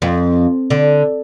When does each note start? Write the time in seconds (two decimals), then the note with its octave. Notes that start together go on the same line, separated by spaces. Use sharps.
0.02 F2
0.70 D3